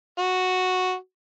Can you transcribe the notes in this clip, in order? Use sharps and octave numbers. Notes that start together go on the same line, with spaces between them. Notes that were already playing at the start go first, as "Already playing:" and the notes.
F#4